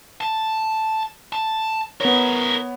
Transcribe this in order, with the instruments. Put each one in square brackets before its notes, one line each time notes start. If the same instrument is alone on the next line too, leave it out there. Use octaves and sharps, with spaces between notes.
[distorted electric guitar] A5
A5
[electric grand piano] B3 C#5 [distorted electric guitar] E4 A#4